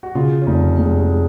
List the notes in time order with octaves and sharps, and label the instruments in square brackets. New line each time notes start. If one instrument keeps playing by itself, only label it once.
[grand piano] F#4
[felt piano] C#3 [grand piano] F4
[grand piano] C#4
[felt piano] F1 [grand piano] D#4
[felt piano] F1 [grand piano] G#3
[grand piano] G#3